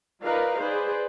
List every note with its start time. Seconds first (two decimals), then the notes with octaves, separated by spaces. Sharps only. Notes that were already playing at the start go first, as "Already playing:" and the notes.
0.24 D#4 F4 A#4 B4 D5 F5
0.60 G#4 B4 C5 D5